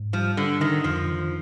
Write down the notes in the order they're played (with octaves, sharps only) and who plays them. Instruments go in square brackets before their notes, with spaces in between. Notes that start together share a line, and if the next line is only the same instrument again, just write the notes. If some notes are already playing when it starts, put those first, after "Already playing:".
Already playing: [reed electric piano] G#2
[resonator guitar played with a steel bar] F3 [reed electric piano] G3
[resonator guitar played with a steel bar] D3 [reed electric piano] G3
[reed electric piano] D3 [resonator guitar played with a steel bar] D#3
[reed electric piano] F2 [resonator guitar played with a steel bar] F3
[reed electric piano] D#3